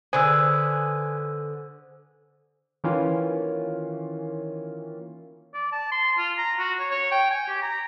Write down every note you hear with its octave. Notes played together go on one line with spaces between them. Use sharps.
D3 G#4 B4 C5 G#5 D#6 E6
D#3 E3 A#3 C#4 F4
D5
A5
C6
F4
A#5
F#4
C#5
C#5
G5
G#5
G4
A#5